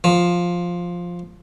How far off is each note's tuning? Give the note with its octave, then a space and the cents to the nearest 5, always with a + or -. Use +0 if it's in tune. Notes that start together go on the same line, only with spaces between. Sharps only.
F3 +5